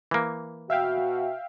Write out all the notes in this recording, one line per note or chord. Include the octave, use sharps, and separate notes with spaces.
E3 A#3
B2 F#4 E5 F5 G5